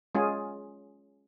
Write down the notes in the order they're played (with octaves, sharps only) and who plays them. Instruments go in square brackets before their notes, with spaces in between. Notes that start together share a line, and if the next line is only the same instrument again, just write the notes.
[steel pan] G#3 C#4 F4 G#4